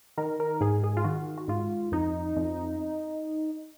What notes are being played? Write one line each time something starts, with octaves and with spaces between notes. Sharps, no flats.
D#3 A#4
A#4
G#2 G#4
G#4
F4
D#3 F#4
F#4
G#2 F4
F2 D#4
F2